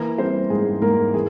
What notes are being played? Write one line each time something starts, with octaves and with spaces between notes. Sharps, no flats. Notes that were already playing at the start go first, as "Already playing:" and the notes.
Already playing: E3 A#3 A#4
G3 C4 C5
G#2 G#4
G#2 A#3 A#4
E3 G#4